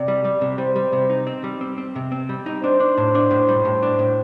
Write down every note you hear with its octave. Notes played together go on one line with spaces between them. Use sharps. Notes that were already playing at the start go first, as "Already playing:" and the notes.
Already playing: C3 D5
G3
G3
C3
G3 C5
G3
C3
D#4
C4
G3
C4
C4
C3
C4
G3
D#4
D4 C5
D4
A2
D4
A2
G3
A2
D4
A2